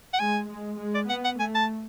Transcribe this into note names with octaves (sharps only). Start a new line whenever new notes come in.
F#5
G#3 G#5
G#3
G#3
D5
B3 F#5
F#5
A3 G#5
A5